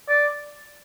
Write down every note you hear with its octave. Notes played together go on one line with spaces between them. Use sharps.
D5